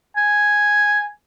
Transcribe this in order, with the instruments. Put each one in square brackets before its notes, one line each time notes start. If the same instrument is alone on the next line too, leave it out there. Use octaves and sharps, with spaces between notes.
[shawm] G#5